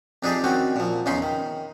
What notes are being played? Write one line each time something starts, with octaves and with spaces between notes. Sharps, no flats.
F2 D4 D#4 G4 G#4 D5
D#3 C4 C#4 F#4
A#2 F3
E2 C#3 C#4 D#4 B5 C6
D#3